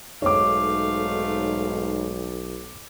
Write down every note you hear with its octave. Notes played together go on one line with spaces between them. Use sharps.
B1 G#2 A3 C#5 F5 D6